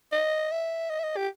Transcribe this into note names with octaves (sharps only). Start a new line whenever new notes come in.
D#5
E5
D#5
E5
D#5
G4